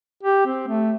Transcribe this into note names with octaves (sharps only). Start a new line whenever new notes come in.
G4
C4
A3